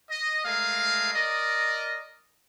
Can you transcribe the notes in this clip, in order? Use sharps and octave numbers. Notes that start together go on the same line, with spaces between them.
D#5
G#3 A3 G#4 A#4 F5
A#4 D5 D#5